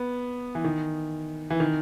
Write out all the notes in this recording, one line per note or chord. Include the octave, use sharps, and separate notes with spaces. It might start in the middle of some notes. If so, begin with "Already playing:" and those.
Already playing: B3
E3
D#3
E3
D#3